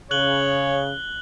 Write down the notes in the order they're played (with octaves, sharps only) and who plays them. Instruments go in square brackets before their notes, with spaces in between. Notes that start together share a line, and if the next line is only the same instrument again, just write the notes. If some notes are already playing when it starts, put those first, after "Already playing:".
[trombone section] C#3 [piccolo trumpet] C#5 [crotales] F#6 F#7 G7